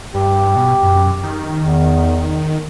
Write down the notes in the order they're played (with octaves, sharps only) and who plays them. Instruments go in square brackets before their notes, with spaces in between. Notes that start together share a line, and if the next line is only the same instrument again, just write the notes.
[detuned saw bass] G2 [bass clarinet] G4
[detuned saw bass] B2
F#2
D#3
[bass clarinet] E2